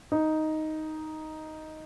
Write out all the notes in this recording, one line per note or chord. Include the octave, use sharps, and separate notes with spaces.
D#4